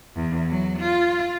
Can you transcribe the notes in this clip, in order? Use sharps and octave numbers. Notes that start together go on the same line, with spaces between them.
E2
F#3
F4